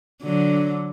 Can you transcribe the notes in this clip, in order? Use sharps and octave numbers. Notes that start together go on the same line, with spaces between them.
D3 F#3